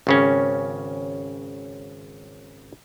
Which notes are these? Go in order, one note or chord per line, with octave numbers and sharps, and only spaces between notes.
G#1 C#3 C#4